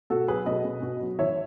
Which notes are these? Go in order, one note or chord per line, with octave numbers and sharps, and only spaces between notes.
B2 F#4 A4
F#3 G#4 B4
B2 B4 D#5
B2
B2
F#3
E3 C#5 E5